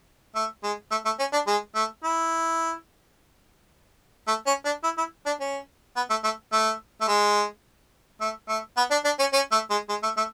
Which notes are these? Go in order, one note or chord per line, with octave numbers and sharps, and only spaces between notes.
A3
G#3
A3
A3
C#4
D4
G#3
A3
E4
A3
C#4
D4
E4
E4
D4
C#4
B3
A3
A3
A3
A3
G#3
A3
A3
B3
D4
D4
C#4
C#4
A3
G#3
G#3
A3
A3